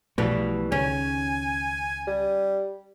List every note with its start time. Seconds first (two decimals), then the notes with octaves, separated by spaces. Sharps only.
0.18 B1 B2 E3 F3 G3 A3
0.72 C#2 D#3 C#4 G#5
2.07 G3